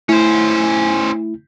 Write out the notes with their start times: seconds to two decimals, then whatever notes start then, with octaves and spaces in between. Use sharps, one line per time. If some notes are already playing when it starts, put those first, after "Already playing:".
0.09 A3 C#4 E4 C5